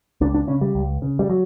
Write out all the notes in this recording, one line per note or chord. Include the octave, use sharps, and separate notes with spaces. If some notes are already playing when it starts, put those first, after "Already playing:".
C#2 D4
D4
C#3 C#4
G3
C#2
C#3
G3
F#3